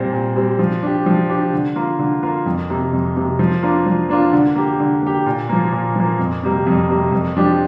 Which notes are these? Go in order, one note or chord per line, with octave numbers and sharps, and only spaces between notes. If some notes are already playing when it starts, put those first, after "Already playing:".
Already playing: A#2 G3 C4
A#2
G3 C4
F3
D4 G4
F3
D4 G4
D3
A#3 F4
D3
A#3 F4
F2
C3 A#3
F2
C3 A#3
F3
A#3 D4 F4
F3
A#3 D4 F4
D3
A#3 G4
D3
A#3 G4
A#2
F3 A#3
A#2
F3 A#3
F2
C3 G3 A#3
F2
C3 G3 A#3
F2
F3 D4 G4